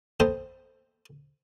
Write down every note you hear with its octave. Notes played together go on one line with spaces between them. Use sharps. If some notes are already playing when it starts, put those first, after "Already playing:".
B3 A4 C5 D#5 G5 A#5